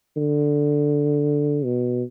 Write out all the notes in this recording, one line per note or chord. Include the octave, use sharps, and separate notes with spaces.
D3
B2